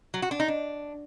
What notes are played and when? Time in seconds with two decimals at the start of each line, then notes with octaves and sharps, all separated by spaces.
0.14 F#3
0.22 F#4
0.31 D4
0.40 D#4
0.48 D4